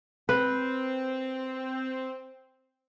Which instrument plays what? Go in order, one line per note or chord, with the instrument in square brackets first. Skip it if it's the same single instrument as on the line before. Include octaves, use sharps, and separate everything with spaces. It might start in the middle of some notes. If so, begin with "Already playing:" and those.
[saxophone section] C4 [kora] B4